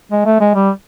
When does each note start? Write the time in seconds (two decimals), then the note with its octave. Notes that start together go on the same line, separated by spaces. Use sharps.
0.12 G#3
0.26 A3
0.40 G#3
0.55 G3